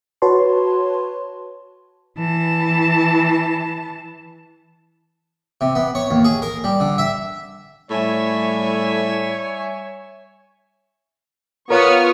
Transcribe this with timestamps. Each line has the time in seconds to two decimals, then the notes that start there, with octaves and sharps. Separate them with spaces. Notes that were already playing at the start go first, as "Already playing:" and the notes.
0.22 F#4 B4 C#5 A5 C6
2.18 E3 A5
5.61 C3
5.75 B3
5.95 C#5
6.11 D#2
6.25 G#4
6.42 A#4
6.64 G3
6.80 D3
6.98 E5
7.90 A2 G3 C#5 E5 G#5
11.70 B3 F4 A#4 C#5 C#6 D#6 F6